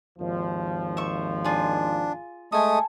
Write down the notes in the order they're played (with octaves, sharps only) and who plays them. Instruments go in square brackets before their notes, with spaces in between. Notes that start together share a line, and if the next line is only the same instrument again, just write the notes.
[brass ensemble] G#1 D#2 F3
[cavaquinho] E5 C#6
[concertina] D4 [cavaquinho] F4 G#4
[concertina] G#3 A3 D#6 [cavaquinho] A4 G#5